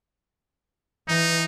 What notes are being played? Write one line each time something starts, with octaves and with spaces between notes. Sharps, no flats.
E3 D#4